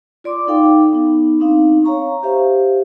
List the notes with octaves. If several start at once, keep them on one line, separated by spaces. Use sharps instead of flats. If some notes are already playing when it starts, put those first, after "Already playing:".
F4 D5 C6 D6
D#4 A4 F5 G5 D6
B3 D#4
C4 D4 D#4 F5
C#5 F5 A#5 C#6
G4 C5 E5 F5